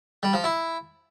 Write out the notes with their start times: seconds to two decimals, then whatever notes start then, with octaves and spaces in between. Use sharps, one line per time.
0.23 G3
0.33 F3
0.44 E4